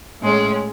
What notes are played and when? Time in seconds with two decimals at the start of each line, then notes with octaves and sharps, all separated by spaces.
0.21 A2 G#3 C#4